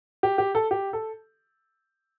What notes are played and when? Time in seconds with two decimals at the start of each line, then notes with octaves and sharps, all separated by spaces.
0.23 G4
0.38 G4
0.55 A4
0.71 G4
0.93 A4